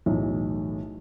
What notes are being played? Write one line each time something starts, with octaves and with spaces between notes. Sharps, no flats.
B1 E2 A2